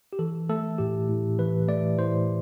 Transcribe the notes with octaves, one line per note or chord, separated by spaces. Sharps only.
G4
E3 A4
A3 A4
A2 G4
A2
E3 B4
A3 D5
A2 C5